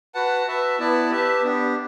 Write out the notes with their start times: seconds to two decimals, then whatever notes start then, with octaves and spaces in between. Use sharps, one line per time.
0.15 F#4 B4 F#5 A5
0.47 F#4 B4 E5 A5
0.79 B3 E4 B4 D5 A5
1.10 G4 B4 E5 A5
1.42 B3 D4 G4